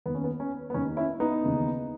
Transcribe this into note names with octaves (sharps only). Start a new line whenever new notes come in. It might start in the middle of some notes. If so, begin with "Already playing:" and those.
D#2 D#3 A#3 B3
C#4
B3
C#4
B3
D#2 D#3 A#3 C#4
C#4 E4
B3 D#4
D#2 C#3 E3 A#3